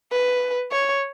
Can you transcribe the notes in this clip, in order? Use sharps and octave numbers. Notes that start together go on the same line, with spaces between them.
B4
C#5